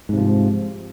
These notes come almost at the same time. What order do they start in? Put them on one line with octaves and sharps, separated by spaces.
G#2 C3 F3